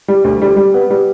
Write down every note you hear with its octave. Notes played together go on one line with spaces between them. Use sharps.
G3
D2
G3
G3
B3
G3